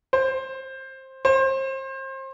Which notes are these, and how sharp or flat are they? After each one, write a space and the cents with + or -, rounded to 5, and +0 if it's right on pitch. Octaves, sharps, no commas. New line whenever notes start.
C5 +15
C5 +30